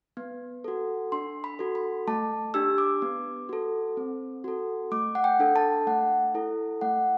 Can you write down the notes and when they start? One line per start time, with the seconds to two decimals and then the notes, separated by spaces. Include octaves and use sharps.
0.17 B3
0.64 F#4 A4
1.12 D4 C6
1.44 B5
1.59 F#4 A4
1.75 B5
2.07 A3 A5
2.54 D4 G4 E6
2.78 D6
3.02 B3
3.49 F#4 A4
3.97 C4
4.44 F#4 A4
4.91 A3 D6
5.15 F#5
5.24 G5
5.40 D4 A4
5.56 A5
5.87 A3 F#5
6.34 E4 A4
6.81 A3 F#5